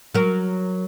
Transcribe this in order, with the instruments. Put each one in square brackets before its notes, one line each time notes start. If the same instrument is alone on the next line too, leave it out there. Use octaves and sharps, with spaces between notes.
[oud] F#3 A#4